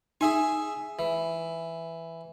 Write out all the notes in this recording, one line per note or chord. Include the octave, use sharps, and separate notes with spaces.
D#4 G#4 E5 G#5
E3